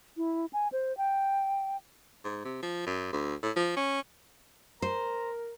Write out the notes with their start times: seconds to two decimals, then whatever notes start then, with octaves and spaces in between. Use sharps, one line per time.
0.17 E4
0.53 G#5
0.72 C5
0.97 G5
2.25 G#2
2.44 C3
2.62 F3
2.86 F#2
3.13 D2
3.43 A2
3.56 F3
3.76 C#4
4.82 A#4 C5 A#5